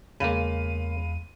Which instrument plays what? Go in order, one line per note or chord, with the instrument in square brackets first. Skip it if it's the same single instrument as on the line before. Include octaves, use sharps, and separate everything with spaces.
[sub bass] E2 [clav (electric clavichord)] C#3 A#3 [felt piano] G#3 F5 B5 [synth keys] D#7